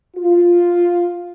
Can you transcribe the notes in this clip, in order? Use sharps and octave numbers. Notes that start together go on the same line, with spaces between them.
F4